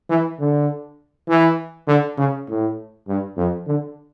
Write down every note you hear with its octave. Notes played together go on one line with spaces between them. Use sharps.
E3
D3
E3
D3
C#3
A2
G2
F2
D3